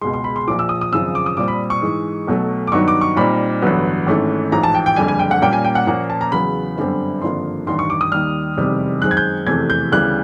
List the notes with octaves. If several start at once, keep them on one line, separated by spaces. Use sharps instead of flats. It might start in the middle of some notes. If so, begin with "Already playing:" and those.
C#2 B2 G#3 C6
C6
B5
C6
A#1 A#2 F3 D6
E6
D#6
D#6
G#1 F#2 C#3 F3 E6
D6
D#6
A#2 G3 C4 D6
B5
C#6
G#2 E3 G#3
B1 B2 F#3 A3
D6
G2 D#3 F#3 B3 D#4 C#6
D6
C#6
A#2 G3 C4 D#4 B5
A1 G2 D3 F#3 B3
G#1 G#2 E3 A3 C#4
A1 G#2 F3 A#5
A5
G5
G5
F#1 F2 D3 G3 G#5
G#5
G5
F#5
A#2 G3 A#3 C#4 G5
G#5
G5
F#5
A#2 F3 A#3 C#4 F#5
A5
A#5
E2 C#3 F#3 B3 B5
G1 F#2 D3 G3 C4
G#1 G2 D3 F3 A#3 C6
A1 G2 D#3 C6
C#6
D6
D#6
D#2 D#3 G3 F6
F1 E2 C3 D#3 G3
F#2 D#3 G#3 C4 F#6
G#6
G6
F1 E2 C3 E3 A3 G#6
G6
D2 C#3 E3 G3 B3 F#6